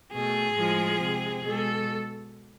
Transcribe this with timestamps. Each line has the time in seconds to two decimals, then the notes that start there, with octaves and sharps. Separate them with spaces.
0.12 B2 A3 G#4
0.56 A2 F3 G#3
1.01 C3 G#3
1.45 B2 G#3 A4